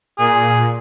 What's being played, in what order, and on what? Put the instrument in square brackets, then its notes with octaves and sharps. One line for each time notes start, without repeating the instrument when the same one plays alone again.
[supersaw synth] A#2 [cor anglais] G#4